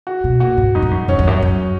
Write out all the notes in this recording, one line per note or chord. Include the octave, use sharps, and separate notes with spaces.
F#4
B2
A#2 F#4
G#2
F#2 D#4
G#2
F#2
F#2 C#4
E2
F#2
F#2